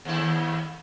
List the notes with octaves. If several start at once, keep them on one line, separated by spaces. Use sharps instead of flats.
D#2 A2 E4